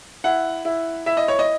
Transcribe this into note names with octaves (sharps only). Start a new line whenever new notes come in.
E4 F#5
E4
E4 E5
D#5
C#5
D#5